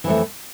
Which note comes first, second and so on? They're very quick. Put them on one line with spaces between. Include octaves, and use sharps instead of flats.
E3 F2 A3